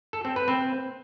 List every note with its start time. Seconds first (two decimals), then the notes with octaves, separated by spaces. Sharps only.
0.13 A4
0.25 C4
0.36 B4
0.48 C4